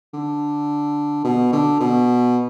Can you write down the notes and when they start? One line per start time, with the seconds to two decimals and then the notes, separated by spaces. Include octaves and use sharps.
0.14 D3
1.25 B2
1.53 D3
1.80 B2